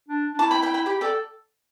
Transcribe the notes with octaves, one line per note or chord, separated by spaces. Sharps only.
D4
D4
E4 A5 D6
G5 B5
G5 B5
G5 B5
G4 G5 B5
A4 D5 G5